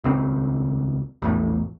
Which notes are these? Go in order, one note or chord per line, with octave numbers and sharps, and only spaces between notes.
D#1 C#2 C4
A#1 E2 A2